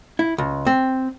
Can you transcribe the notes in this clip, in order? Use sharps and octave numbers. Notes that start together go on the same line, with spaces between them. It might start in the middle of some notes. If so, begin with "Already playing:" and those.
E4
C#2
C4